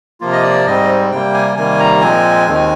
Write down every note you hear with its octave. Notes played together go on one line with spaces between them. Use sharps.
C3 F3 A#3 F4
D#5
D5
G#2 G3 C4 D#5
C3 G3 A#3 G5
G#5
C3 D#3 G3 A#3 G#5
A#5
A#2 F3 G#3 C4 G#5
D#2 D#3 G#3 C4